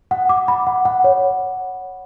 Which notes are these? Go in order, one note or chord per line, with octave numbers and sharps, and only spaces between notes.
F#5
D6
B5
F#5
F#5
C#5